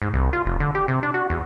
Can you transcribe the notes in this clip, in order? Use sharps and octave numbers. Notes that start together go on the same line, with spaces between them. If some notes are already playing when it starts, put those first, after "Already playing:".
G#2
C2
F4
F1
D3
G4
C3
D4
F#4
E2